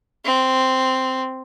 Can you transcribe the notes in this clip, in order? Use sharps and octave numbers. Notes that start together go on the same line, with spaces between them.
C4